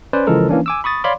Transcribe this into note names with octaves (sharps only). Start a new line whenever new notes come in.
C#4 B4 C5 D5
C#3 E3 F3 G#3 A4 A#4
E3 A#3 C#4 D4
G#5 D6 E6
B5 C#6 D#6 A6
C#5 D5 F5 B5 C6 D6